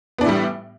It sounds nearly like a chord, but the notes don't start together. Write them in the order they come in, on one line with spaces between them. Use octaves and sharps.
B3 D4 E3 A2 G3